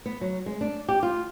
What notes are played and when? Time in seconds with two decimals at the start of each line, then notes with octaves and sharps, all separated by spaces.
0.06 B3
0.21 F#3
0.46 G#3
0.61 D4
0.89 G4
1.03 F4